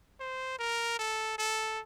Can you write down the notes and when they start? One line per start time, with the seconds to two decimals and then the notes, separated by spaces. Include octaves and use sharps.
0.20 C5
0.59 A#4
0.99 A4
1.38 A4